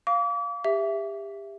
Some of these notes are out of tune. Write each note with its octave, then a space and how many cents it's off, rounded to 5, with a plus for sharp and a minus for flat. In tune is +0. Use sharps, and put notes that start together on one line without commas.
F5 +0 D6 -40
G4 +30 E5 +5